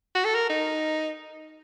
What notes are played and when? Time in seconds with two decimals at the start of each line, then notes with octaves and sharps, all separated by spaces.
0.15 F#4
0.24 A4
0.35 A#4
0.50 D#4